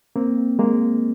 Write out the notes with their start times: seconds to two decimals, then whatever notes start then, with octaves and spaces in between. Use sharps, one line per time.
0.16 A#3 C4
0.59 G#3 A#3